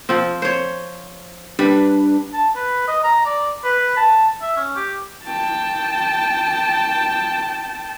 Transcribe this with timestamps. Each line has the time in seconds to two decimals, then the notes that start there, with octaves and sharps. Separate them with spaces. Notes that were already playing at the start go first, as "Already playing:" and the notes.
0.09 F3 C4
0.42 C5 C#5
1.59 G3 D4 B4
2.34 A5
2.56 B4
2.88 D#5
3.04 A#5
3.26 D5
3.64 B4
3.97 A5
4.42 E5
4.57 C#4
4.76 G4
5.24 G5 A5